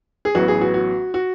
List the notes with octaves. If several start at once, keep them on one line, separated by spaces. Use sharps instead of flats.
G#4
A1 A2 F#3 B3 F#4
G#4
F#4
F#4
F#4